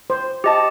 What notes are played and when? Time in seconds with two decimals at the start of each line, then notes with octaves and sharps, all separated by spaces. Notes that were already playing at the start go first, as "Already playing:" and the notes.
0.10 C5
0.44 G4 D#5 A5